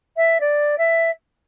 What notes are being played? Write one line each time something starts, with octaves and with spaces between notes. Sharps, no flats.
E5
D5
E5